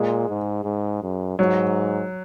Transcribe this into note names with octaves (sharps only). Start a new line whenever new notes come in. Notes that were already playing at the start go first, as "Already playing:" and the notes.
Already playing: A#2 G#3
G#2
G#2
F#2
G#2 F#3